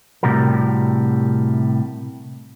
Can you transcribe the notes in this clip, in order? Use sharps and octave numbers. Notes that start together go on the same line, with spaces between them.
A2 C3 G3 F#4 A#4